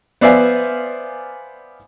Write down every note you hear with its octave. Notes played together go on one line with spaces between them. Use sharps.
B3 C5 D5 E5 F5 G#5